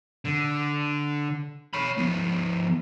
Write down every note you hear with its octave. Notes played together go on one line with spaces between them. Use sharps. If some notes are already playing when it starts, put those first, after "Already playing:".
D3
C#5 B5
F3 B3